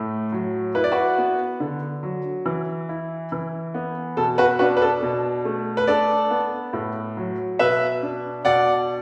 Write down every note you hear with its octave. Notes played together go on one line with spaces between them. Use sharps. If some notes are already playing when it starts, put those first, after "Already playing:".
Already playing: A2 A3
F#3
E4 B4
D5
F#4 B4
B3
D3
F#3
E3
E4
E3
B3
B2 A4
F#4 B4
D4 F#4 B4
B4
A4
B2
A3
B4
D4 A4 D5
B3
A2
F#3
B2 B4 E5
D4
B2 D5 F#5